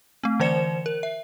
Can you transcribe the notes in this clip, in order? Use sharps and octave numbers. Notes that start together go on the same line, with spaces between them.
A3 C4
D3 E3 C5 D5 C#7 E7
A#4
E5